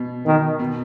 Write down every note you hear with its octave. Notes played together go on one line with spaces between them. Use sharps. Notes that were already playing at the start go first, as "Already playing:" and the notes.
Already playing: B2
B2 D#3
B2